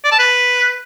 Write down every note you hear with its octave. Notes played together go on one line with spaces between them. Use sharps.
D5
A5
B4